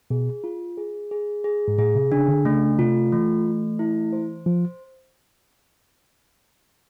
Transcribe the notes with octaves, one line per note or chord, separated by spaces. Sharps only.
B2 G#4
F4
G#4
G#4
G#4
G#2
A2 G#4
C3
C#3 D4
D3
C#3 A3
C3 F4
E3 A3
A3
E4
C5
F3 C5